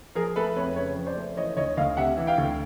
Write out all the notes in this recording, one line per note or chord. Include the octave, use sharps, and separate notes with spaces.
F3 G#4 A#4
A3 A4 B4
F2 B4 C#5
C#3 B4 C#5
F3
C5 D5
A3
E3 C#5 D#5
D2 C#5 D#5
D2 D#5 F5
C3 E5 F#5
E3
F5 G5
D2